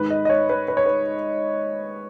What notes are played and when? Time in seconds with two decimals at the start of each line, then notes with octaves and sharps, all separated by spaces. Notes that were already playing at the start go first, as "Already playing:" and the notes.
Already playing: G#2 D#3 B4
0.10 D#5
0.25 D#5
0.30 C#5
0.49 B4
0.68 B4
0.77 C#5
0.86 B4